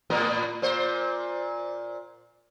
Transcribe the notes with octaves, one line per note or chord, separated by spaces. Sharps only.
A2 B3 A#4
A#2 C5